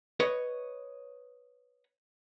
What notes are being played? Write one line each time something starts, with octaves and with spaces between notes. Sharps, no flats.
B4 C#5 D#5